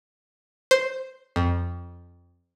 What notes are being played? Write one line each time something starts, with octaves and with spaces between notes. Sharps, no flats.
C5
F2